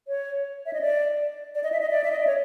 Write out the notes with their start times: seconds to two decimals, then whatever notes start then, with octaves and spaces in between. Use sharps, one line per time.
0.08 C#5
0.66 E5
0.73 D#5
0.81 D5
1.55 D5
1.63 D#5
1.72 E5
1.81 D#5
1.91 D5
2.04 E5
2.12 D#5
2.20 D5
2.27 C#5